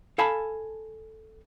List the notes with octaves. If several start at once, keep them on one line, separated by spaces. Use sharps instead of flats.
A4 F5 G#5 A5 B5